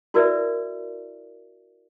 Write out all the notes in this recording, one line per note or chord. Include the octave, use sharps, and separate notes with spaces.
E4 F#4 A#4 B4 D5 E5